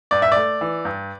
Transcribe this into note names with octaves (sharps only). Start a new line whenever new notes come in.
G2 D5
E5
A3 D5
E3
G2